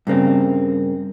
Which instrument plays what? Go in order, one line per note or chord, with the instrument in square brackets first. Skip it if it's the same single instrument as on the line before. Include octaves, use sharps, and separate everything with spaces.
[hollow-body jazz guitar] G2 C#3 A#3 C4